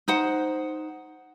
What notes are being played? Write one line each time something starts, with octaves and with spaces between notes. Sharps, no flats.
D#4 C5 F#5